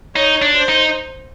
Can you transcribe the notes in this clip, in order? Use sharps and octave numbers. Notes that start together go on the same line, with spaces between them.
D#4 C#5
D4
C5
D#4